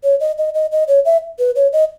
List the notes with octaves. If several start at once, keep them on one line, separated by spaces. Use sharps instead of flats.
C#5
D#5
D#5
D#5
D#5
C#5
E5
B4
C#5
D#5